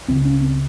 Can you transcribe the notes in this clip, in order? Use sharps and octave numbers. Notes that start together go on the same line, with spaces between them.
C#2 C#3 C4
C#4
C4